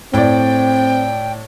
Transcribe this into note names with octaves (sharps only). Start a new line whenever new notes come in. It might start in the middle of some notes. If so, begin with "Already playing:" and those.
A2 C4 D5 G5